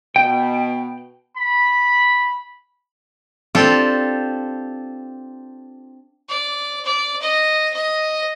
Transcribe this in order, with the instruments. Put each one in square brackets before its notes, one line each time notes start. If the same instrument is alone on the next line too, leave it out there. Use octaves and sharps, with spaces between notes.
[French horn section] B2 [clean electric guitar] G5
[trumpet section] B5
[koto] C4 D4 F4 G4 A4 G5
[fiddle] D5
D5
D#5
D#5